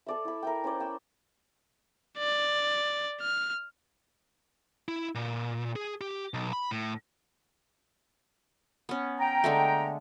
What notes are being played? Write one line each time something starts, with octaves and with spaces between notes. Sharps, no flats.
A4 D5 E5
E4 B5
A#4 E5 G5
C#4 E4 C5 D5
G5 E6
D5
F6
E4
A#2
G#4
G4
B1
B5
A2
B3 C#4
G5 A#5
D3 G#3 A3